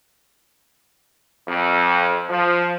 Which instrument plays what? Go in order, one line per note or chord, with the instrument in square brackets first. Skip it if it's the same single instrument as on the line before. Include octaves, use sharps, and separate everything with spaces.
[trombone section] F2
F3